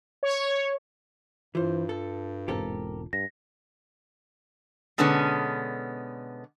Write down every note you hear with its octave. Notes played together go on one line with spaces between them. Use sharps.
C#5
G2 E3 F4 C5
A4
E1 G#2 C4 G4 A4 A#4
G2 A#6
B2 D3 G#3 B3 C#4